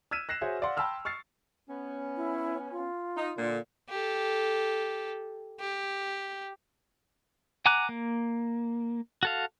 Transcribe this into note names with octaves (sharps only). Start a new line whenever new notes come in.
E6 F6 G#6 B6 D#7 E7
F#6 A#6 C7 E7
F#4 G#4 C5 C#5 E5 G#5
D5 F5 F#5 C6
G5 A5 B5 C6 E6 F6
C#6 F6 A6 C7
B3 C#4
E4
F4
D#4
A#2 D3
G4 A4
G4
F#5 G#5 A#5 D6 F#6
A#3
F#4 A4 F5